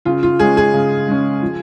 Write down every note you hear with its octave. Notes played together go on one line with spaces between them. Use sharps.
C#3 F4
F4
G#3 C#4 G#4
G#4
C#3
G#3 C#4
F3